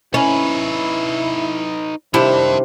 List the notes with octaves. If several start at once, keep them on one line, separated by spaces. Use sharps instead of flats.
C#4 D#4 E4 B4
C3 D#3 G3 C4 D4 E4 A5